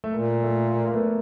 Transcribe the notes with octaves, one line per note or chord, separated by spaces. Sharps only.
A3
A#2 A#3
A3
A#3
A#3
A3 B3